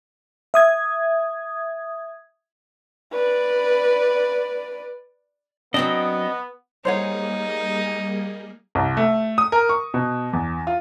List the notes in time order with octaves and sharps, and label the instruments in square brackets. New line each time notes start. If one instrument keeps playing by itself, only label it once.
[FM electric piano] E5 D#6 G#6
[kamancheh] B4 D5
[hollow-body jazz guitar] F#3 C4 D4 [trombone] B3 [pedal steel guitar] D#5
[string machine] G3 A#3 G#4 [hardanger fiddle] D#4 [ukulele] C5 C#5 F#5
[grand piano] C2
A3
D#6
A#4
C#6
B2
E2
F4